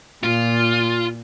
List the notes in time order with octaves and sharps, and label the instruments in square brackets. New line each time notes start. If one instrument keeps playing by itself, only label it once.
[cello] A#2 [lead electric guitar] F4